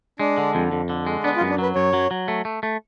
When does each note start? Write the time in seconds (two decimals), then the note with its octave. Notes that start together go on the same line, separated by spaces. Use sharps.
0.19 G#3 D4
0.38 D3
0.55 F2
0.72 F2
0.90 D3
1.07 G#3
1.24 B3 D4
1.36 F4
1.41 F#2
1.50 D4
1.59 F#3 B4
1.75 F#2 C#5
1.93 F#3
2.11 F#3
2.28 A3
2.45 A3
2.63 A3